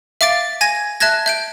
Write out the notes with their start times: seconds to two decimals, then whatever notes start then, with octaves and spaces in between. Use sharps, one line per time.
0.21 E5 F5 D6 A6 D7
0.61 G#5 G#6 A#6 D#7
1.00 E5 A5 F#6 G#6 A#6
1.26 E5 G6 D7